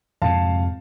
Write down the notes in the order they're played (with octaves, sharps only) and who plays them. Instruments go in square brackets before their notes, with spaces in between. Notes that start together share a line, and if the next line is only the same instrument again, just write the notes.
[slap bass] F2 G#2 C3 [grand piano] F5 A5